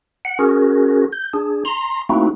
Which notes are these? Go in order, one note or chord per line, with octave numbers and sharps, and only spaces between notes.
F#5
C#4 F#4 G#4 A#4
G6
D4 G#4
A#5 C6
A3 A#3 C4 D#4 E4 F#4